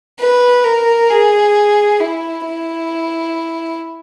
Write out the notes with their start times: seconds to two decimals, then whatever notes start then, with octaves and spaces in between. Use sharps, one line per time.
0.20 B4
0.64 A#4
1.10 G#4
2.00 E4
2.45 E4